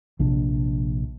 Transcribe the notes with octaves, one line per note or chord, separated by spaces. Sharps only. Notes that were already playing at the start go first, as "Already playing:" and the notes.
A#1 C3 D4